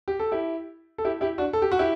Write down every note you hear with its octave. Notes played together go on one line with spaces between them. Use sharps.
G4
A4
E4 G4
A4
E4 G4
E4 G4
D4 F#4
A4
G4
F#4
E4 G4